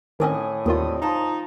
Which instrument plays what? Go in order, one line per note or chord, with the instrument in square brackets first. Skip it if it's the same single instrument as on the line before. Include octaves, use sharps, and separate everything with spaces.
[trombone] A2 [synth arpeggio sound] D#3 C4 C#4 [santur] D5 D#5 G#5
[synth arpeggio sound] D#2 D#3 F4 [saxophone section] D3 G3 C4 [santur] D#6
[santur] F3 A5 A#5 [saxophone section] D#4